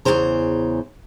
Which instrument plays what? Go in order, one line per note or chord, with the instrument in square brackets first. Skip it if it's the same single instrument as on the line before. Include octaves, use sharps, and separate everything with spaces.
[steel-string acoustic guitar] E2 A#2 C#3 E3 C5 A#5